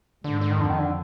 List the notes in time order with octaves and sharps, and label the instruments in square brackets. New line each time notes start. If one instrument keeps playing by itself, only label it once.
[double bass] G#2 [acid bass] D3
[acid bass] D3
D#3
[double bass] F2 [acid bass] D3
[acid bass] D#3
D3